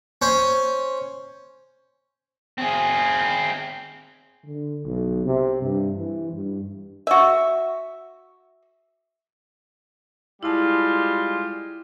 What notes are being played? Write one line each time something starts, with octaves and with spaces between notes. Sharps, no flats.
C#4 C5
C4 G#4
D3
B1
C3
G2
E3
G2
F#4 E5
G3 G#3 E4 F4 A5